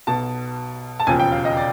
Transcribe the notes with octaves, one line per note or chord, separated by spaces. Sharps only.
B1 B2 A5
A5
E1 D#2 C#3 F3 G#5
G5
F5
D#5
D5